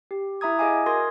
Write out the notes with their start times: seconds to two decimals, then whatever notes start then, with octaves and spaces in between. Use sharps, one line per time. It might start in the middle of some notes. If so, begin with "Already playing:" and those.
0.11 G4
0.41 E4 E5 A#5 D#6 G#6
0.58 G#4 D#5 F5 G#5 D6
0.86 F#4 A#4 C6 D#6 G#6 A#6